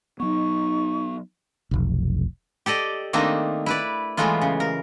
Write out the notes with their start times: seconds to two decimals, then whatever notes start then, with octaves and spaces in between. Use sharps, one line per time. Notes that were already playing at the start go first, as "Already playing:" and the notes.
0.20 F#3 B3 D#4 C#6
1.71 F1 B1
2.66 G4 A4 D5 D#5
3.13 D#3 A3 A#3 C4 D4 D#4
3.66 E4 B4 D5
4.17 E3 F#3 G#3 A3 B3 F4
4.41 C#3
4.60 A#4